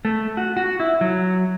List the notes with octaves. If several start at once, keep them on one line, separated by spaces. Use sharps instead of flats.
A3
F#4
F#4
E4
F#3